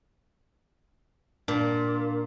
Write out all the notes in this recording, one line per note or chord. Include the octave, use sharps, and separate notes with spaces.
A#2 D4